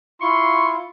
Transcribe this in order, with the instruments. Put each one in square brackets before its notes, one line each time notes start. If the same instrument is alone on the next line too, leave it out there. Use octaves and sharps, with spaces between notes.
[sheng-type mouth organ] E4 F4 [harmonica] C6 [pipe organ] C#6